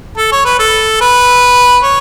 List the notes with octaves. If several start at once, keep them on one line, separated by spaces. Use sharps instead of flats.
A4
C#5
B4
A4
B4
C#5